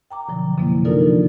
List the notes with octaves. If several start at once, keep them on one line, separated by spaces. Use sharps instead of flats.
G5 A#5 D6
B2 D3 F3 F#3
F#2 C3 F3 G#3 A#3 E4
D4 D#4 F4 A4 A#4 D5
E3 F3